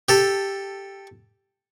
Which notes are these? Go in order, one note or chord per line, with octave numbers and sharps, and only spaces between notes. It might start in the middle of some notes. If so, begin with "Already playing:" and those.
G4 A4